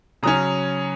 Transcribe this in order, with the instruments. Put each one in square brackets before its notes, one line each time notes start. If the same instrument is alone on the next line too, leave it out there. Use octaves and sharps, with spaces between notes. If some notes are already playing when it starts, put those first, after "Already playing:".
[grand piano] C#3 F#3 C#4 A#5 D#6